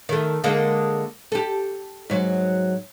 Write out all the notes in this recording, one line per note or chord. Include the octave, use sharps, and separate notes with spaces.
D#3 A3
D3 G#3 A#3
G4 A4
G#2 F#3